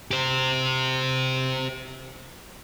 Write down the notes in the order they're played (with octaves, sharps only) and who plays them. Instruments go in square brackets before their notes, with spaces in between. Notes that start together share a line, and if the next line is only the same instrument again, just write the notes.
[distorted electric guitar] G4 C5